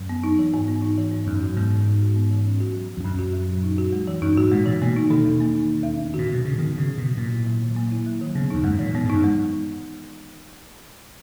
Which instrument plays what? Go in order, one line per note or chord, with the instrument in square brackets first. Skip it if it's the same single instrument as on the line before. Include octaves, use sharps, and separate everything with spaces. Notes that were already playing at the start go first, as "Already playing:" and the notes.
Already playing: [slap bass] F#2
[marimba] B3
D#4
E3
G#2
B3
D#4
E3
G#2
[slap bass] F#2 [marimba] D#4
[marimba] F#4
[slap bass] G#2 [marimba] B3
[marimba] E3
D#4
F#4
B3
E3
C#4
F#4
F#3
A#2
[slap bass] E2
[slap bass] F#2 [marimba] C#4
[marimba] F#4
F#3
A#2
D#4
F#4
G#3
E3
[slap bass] F#2 [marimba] D#4
[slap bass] G#2 [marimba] F#4
[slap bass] A#2 [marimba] G#3
[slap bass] A#2 [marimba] E3
[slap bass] B2 [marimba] A#3
[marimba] D#4
[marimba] B2 [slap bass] D#3
[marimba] E2
A#3
D#4
B2
E2
B3
[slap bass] A#2 [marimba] F#4
[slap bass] B2 [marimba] F#3
[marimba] G#2 [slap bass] C#3
[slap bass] D#3 [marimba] B3
[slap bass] C#3 [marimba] F#4
[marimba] F#3
[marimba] G#2 [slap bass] B2
[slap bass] A#2 [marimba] A#3
[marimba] E4
F#3
D#3
A#3
E4
F#3
D#3
[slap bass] C#3 [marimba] B3
[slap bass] E2 [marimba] D#4
[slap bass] F#2 [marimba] G#3
[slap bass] G#2
[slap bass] A#2 [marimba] E3
[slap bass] A#2 [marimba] B3
[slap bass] G#2
[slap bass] F#2 [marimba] D#4
[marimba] G#3